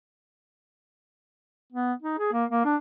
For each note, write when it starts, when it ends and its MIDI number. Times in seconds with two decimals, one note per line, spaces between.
1.73 1.93 59
2.02 2.18 63
2.19 2.31 68
2.33 2.45 58
2.50 2.65 58
2.65 2.76 62